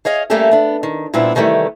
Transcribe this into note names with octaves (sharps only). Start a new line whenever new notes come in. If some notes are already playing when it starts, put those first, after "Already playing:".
G#4 C#5 D#5 F5
G3 A3 A#3 C#4 G4 A4
B3 D4
D#3
A#2 G3 B3 C4 D4 E4
C3 D#3 E3 G3 A3